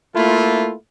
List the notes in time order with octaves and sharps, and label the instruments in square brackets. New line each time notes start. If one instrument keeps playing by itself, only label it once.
[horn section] A3 A#3 E4 F4